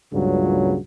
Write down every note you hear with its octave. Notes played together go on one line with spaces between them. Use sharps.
C#2 G2 A#2 C#3 F#3